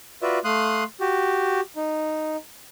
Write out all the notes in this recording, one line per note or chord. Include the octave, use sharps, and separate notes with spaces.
F4 F#4 B4 D5 E5
A3 F5 C6 D#6 F#6
F#4 G4
D#4